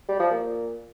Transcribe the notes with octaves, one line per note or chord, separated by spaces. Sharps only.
G3
F3
A#2